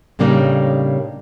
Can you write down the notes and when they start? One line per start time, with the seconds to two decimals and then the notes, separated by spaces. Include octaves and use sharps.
0.19 A2 C#3 G3 A#3 D4 D#4